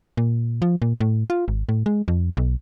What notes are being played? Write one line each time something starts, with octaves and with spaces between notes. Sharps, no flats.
A#2
F3
A#2
A2
F4
G#1
A2
G#3
F2
B1